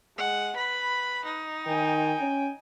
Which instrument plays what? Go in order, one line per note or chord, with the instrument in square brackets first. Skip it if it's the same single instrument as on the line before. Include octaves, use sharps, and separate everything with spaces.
[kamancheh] G#3 [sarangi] F#5
[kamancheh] B4 [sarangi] B5
[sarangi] D#4
[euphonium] D#3 [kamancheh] G5 G#5
[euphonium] C#4